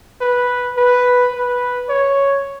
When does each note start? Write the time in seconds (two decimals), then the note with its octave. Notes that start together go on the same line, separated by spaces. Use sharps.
0.21 B4
0.77 B4
1.33 B4
1.89 C#5